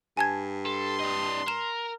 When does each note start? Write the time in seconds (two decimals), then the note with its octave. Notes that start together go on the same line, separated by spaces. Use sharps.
0.17 G2 G#5 A5 G#6
0.66 A4 C6
1.01 D4 D#5
1.48 A#4 E7